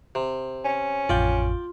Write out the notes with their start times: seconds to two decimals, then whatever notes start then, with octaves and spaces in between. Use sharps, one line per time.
0.15 C3
0.65 C#4
1.09 A1 F2 F4 D5 G5